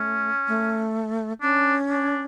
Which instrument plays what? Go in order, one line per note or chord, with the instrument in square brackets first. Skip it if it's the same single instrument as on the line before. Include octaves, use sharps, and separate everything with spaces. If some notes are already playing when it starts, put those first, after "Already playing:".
Already playing: [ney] A3 [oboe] C#4
[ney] A3
[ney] C#4 [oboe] D4
[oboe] D4